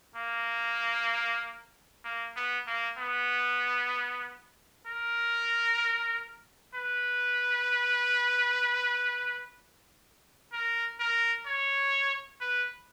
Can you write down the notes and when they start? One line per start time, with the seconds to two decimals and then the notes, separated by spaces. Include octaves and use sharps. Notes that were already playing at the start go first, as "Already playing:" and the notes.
0.16 A#3
2.04 A#3
2.36 B3
2.67 A#3
2.98 B3
4.87 A#4
6.75 B4
10.53 A#4
11.00 A#4
11.47 C#5
12.41 B4